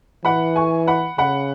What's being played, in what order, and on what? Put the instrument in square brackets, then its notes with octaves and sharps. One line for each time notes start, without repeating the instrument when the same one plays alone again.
[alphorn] E3 [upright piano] F#5 B5
[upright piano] G#5 C#6
F#5 B5
[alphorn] C#3 [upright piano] F#5 B5